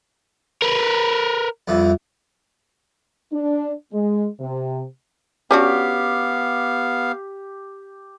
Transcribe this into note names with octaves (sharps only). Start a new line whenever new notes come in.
A#4 B4
C2 F2 E3
D4
G#3
C3
B3 C#4 D4 F#4 G4 F5